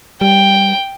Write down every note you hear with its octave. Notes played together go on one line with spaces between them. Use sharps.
G3 G5